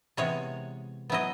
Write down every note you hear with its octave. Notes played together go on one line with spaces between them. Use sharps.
C3 E3 G#3 B3 C#5
F#3 B3 E4 D#5